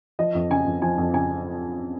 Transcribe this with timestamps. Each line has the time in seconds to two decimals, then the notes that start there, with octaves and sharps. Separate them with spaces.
0.19 F3 D#5
0.35 F2
0.50 C#3 G#5
0.66 F2
0.82 F3 G#5
0.98 F2
1.13 C#3 G#5